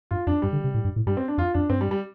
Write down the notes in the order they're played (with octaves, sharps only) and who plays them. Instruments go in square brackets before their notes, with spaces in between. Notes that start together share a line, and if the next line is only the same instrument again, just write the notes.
[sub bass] G2 [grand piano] F4
[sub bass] F2 [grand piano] D4
[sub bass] G2 [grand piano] G3
[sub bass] D3
C3
A2
G2
A2
[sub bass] G2 [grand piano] G3
[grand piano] C4
D4
[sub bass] F2 [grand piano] F4
[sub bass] F2 [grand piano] D4
[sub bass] G2 [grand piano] C4
[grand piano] G3
G3